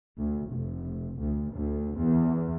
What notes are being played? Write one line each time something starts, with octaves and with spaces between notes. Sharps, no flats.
D2
F1
D2
D2
E2